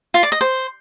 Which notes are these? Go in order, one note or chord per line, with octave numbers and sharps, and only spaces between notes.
F4
D5
D#5
C5